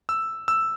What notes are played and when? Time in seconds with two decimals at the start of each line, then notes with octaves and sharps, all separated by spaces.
0.09 E6
0.48 E6